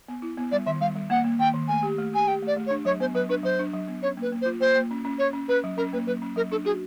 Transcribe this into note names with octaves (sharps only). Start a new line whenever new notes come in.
B3
E4
B3
G3 D5
D#3 E5
G3 F5
G3
A#3 F#5
A#3
D#3 G5
D#3
A3 G#5
G4
A3
G4 G#5
G4 G5
A3 D5
A3
C#5
D4
F#3 C#5
B3 C5
F#3 B4
D4 B4
F#3 C5
D4
F#3
B3
C#4 C#5
A#3 B4
A#3
C5
F4
A#3 C5
A#3
C#4
C#4
C#4 C#5
C#4
C#4 B4
F#3
C#4 A#4
A#3 B4
F#3 B4
C#4
F#3 A#4
D4 A4
F#4 G#4